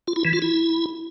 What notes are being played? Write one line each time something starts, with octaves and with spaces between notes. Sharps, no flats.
F4
E4
E3
F4
E4